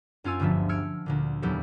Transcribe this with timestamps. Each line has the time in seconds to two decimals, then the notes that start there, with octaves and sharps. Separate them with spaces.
0.24 F#2 C#4 F4 G#5 E6 C#7
0.39 G1 D2 G2 F3 E5
0.69 E6 F6 G#6 C#7 D7
1.06 D2 A#2 D3
1.42 D#1 E2 F#3 G4 A4